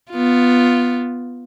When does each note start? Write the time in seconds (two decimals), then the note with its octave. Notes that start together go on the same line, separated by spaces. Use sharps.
0.11 B3 F4